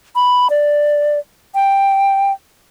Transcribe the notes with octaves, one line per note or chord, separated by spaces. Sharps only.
B5
D5
G5